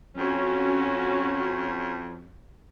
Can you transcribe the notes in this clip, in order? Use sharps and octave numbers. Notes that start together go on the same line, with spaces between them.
F2 C#4 F#4